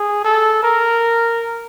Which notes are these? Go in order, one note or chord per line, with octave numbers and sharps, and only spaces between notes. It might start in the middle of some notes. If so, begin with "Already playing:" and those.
Already playing: G#4
A4
A#4